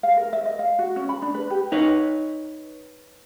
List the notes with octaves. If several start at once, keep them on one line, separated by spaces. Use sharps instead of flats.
F5
A#4
E5
D#5
F5
F#4
C#4
B5
D4
B4
G4
D#4 B4 C#5